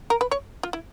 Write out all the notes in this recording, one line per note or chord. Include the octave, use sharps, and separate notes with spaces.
A#4
B4
C#5
F4
E4